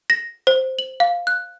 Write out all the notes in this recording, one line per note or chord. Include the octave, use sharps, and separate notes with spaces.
A#6
C5
F#7
F5
F#6